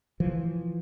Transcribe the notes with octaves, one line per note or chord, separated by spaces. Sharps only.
E3 F3